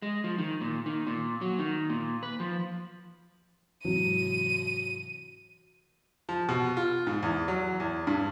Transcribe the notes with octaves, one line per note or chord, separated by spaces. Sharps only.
G#3
F3
D#3
A#2
D#3
A#2
F#3
D#3
A#2
B4
F3
G#2 C3 E3 F#3 D#7
F3
B2
F4
G#2
E2
F#3
E2
G2